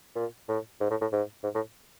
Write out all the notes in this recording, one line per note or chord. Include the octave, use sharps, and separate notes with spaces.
A#2
A2
G#2
A2
A2
G#2
G#2
A2